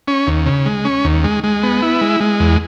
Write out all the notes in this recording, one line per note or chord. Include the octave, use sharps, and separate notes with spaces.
C#4
D#2
C#3
G#3
C#4
D#2
G#3
G#3
B3
E4
G#3
G#3
E2